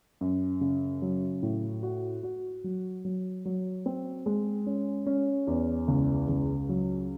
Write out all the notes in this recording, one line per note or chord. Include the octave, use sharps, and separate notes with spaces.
F#2
C#3
F#3
A2
F#4
F#4
F#3
F#3
F#3
C4
G#3
C#4
C#4
E2
C#2
C#2
F#3